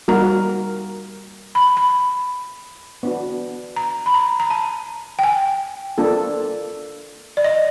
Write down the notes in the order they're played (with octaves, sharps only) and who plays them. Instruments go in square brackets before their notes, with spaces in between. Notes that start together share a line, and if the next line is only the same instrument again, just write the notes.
[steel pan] G3 A#3 D#4 F#4 A#4 [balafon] A#5
[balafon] B5
B5
[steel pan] B3 D4 F#4
[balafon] A#5
B5
A#5
A#5
A5
G5
G#5
[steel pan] A#3 D4 F4 A4
[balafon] D5
D#5